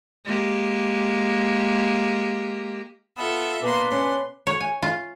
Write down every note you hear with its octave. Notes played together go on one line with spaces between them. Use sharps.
G#3 A#3 G4
B3 F4 A4 E5
B2 A#3 D4 B4 C6
C#4 C6
C#5
G#5
F4